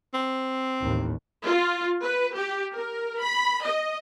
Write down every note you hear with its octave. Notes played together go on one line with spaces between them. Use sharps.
C4
A1 D#2
F4
B4
G4
A#4
B5
D#5